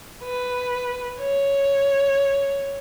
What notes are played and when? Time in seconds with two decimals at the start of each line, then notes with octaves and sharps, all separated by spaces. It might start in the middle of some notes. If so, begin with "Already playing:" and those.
0.25 B4
1.21 C#5